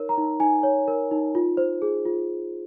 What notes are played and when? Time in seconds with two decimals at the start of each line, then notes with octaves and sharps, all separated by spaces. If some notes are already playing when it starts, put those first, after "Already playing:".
Already playing: D#4 A#4 C#5
0.09 A#5
0.18 D#4
0.40 D#4 G#5
0.63 C#5
0.88 A#4
1.11 D#4
1.35 F4
1.57 C5
1.82 G#4
2.06 F4